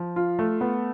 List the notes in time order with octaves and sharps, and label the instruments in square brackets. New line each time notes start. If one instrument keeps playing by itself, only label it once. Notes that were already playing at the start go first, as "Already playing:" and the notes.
Already playing: [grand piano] F3
F4
A3
B3